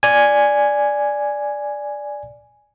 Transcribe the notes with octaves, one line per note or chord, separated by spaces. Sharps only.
D5 G#5